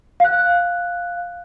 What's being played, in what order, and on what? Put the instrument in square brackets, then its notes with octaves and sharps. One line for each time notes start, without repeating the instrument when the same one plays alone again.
[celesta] F5 F#6